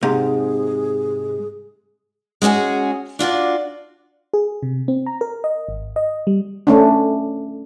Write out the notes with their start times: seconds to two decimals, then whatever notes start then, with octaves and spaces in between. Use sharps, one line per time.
0.03 G#2 C3 G#4
2.42 G#3 B3 C#4 F#4 G#4
3.19 D4 F4 F#4 D5
4.34 G#4
4.63 C3
4.88 C4
5.06 A#5
5.21 A#4
5.44 D#5
5.69 G#1
5.96 D#5
6.27 G3
6.67 A3 C#4 D4